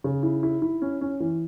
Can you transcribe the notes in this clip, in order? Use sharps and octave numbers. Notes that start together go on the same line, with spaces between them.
C#3
E4
E4
E4
C#4
C#4
E3